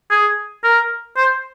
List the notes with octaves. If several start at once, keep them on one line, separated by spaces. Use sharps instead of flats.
G#4
A#4
C5